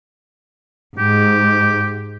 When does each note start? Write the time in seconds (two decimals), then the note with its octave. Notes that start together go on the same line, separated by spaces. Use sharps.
0.98 G#2 G4